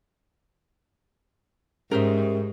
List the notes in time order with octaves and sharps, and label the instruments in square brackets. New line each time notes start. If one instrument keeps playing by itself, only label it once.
[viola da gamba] G#2 [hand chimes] C#4 G4 [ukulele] A#4 C5 E5